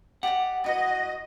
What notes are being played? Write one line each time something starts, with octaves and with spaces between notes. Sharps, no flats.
G4 D5 D#5 F#5
E4 F#4 B4 D#5